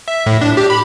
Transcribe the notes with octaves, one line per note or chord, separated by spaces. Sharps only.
E5
A2
D4
G4
B5